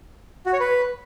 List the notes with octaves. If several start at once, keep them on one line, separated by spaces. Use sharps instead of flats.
F#4
C#5
B4